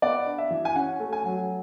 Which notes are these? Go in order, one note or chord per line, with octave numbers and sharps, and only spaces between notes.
B3 D5
D4
E5
E3
G#5
C#4 F#5
A3
G#5
F#3